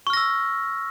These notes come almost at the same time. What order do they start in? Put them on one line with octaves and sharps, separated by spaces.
C#6 F6 A#6 E6